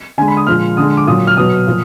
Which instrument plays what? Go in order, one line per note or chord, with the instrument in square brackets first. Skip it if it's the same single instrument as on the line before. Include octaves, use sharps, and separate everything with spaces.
[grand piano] D3 G#5
G#3
B5
D#6
A#2 F3 G#3 F6
D3 G#3 D#6
D6
A#2 F#3 D#6
F6
B2 F#3 D#6
A#2 F3